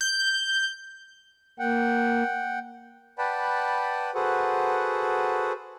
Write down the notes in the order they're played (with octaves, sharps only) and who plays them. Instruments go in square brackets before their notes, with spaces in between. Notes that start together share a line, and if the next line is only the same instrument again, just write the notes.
[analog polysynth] G6
[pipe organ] A#3 [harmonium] F#5 G5
[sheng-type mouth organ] B4 D5 F#5 G5 A5 B5
F#4 G#4 A4 B4 C5 F#5